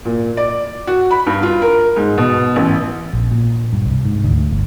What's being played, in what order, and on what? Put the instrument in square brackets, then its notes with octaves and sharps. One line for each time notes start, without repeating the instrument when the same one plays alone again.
[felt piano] A#2
D5
F#4
B5
G2
F4
A#4
G#2
B2
A1
[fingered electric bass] A#1
A#2
G2
C2
G#2
D2
G1